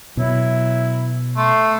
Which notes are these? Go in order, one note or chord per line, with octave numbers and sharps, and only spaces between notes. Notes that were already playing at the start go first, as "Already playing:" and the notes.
B2 F#3 E4
A3 C6